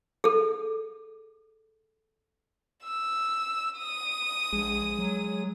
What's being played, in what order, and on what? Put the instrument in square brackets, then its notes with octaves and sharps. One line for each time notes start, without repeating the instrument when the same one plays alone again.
[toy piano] G#4 A4
[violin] E6
D#6
[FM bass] A#1 [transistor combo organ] G#3
[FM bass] F#3